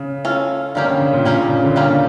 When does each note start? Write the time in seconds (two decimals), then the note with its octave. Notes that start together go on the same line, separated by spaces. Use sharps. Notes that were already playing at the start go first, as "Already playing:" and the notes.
Already playing: C#3
0.25 C#4 F4 A4
0.75 D3 G3 A#3 C#4 G4
0.88 C#3
1.01 C#3
1.13 A#2
1.25 A#2 G3 A#3 C#4 G4
1.38 C#3
1.51 C#3
1.64 D3
1.76 C#3 G3 A#3 C#4 G4